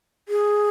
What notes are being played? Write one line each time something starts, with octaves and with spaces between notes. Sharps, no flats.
G#4